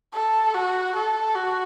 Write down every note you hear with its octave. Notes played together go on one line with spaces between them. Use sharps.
A4
F#4
A4
F#4